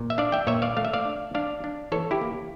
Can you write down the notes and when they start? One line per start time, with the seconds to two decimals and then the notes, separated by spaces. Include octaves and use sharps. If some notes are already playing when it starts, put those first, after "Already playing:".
Already playing: A#2
0.10 E5
0.18 D4 D5 F5
0.32 E5 G5
0.47 A#2 C#5 E5
0.62 D5 F5
0.77 A3 F5
0.85 E5
0.93 D5 F5
1.05 D4
1.35 D4 D5 F5
1.64 D4
1.92 E3 A4 C#5
2.11 E4 G4
2.21 A#3